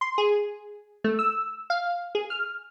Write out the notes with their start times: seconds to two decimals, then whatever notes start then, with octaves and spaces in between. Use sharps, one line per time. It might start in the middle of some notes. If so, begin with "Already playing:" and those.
0.01 C6
0.18 G#4
1.04 A3
1.19 E6
1.70 F5
2.15 G#4
2.30 F6